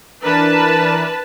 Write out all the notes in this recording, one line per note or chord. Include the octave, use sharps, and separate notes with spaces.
E3 D4 A#4 B4 A5